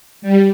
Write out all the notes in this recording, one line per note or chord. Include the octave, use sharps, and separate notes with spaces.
G3